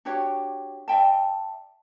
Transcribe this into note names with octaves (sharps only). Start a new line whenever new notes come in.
D4 F#4 G4 C#5
D5 E5 G5 A5